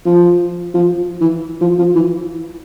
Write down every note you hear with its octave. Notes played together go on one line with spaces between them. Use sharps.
F3
F3
E3
F3
F3
E3